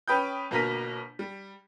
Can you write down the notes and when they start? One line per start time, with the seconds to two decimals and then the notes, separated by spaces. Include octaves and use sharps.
0.08 C#4 B4 G5 D#6 G6
0.51 G1 B2 A#3 A#5 B6 D#7
1.19 G3